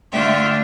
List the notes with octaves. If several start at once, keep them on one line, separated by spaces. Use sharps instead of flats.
D3 A3 D4 F4 E5 G5